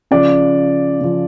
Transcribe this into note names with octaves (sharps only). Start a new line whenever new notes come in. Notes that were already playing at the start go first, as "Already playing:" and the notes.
C#3 F3 D5
C#3 F3